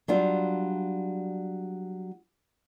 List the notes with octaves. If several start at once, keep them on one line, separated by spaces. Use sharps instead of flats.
F#3 G3 D4 F4